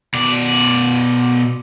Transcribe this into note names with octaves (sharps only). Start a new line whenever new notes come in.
B2 D5